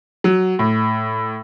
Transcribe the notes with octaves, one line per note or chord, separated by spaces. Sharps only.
F#3
A2